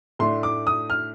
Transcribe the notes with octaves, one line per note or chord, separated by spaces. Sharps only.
A2 A3 D4 C6
D6
D#6
F6